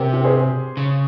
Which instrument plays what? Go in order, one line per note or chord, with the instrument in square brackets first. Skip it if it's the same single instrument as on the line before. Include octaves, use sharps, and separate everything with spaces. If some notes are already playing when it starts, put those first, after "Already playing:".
Already playing: [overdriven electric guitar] C3 [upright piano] G4 A#4 C5
[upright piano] G4 A#4
G#4 C5
[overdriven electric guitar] C#3